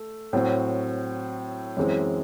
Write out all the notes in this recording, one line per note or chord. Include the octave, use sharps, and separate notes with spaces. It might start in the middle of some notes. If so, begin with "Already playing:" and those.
Already playing: A3
A2 F#3 C4
F#2 E3 G#3 C4